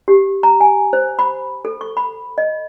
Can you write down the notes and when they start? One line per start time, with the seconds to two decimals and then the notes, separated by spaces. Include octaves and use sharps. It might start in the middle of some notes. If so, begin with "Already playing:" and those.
0.08 G4
0.43 A#5
0.60 G#5
0.93 C5
1.19 B5
1.65 A4
1.81 C#6
1.97 B5
2.38 D#5